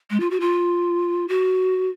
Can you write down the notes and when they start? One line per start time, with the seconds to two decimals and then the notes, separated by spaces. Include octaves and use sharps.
0.10 G#3
0.20 F4
0.30 F#4
0.40 F4
1.28 F#4